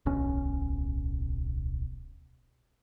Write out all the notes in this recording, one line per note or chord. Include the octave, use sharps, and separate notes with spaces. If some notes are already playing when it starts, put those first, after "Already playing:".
D1 B1 B2 C#4